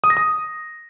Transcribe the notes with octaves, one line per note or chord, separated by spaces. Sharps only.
D#6
A#6
D#6